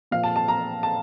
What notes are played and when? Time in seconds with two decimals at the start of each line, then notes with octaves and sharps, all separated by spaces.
0.11 A#2 F3 F5
0.23 A5
0.36 A5
0.48 A#5
0.83 A5